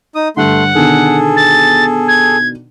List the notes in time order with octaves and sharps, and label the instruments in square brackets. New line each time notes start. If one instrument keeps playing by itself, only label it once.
[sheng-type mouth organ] D#4 D#6
[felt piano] G2 D3 [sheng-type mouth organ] A3 C6 [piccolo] F#5
[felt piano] B2 D3 D#3 [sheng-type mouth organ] G#4 A4
[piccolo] A6
G#6